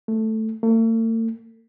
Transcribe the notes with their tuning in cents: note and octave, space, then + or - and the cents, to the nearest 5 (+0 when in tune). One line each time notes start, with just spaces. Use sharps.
A3 +0
A3 +45